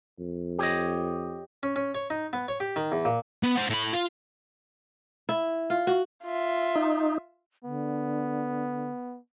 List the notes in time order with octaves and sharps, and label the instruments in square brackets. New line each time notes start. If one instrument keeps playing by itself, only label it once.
[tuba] F2
[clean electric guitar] G4 C#5 D#5
[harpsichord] C#4
C#4
C#5
D#4
B3
C#5
G4
D#3
E2
A#2
[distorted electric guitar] B3
C5 F#5
A2 B5
F4
[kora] E4
F4
F#4
[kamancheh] F4 E5
[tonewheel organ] D#4
[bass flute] D3 [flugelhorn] B3